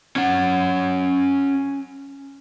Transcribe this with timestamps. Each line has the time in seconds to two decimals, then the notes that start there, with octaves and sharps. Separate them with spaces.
0.16 C#4 F#5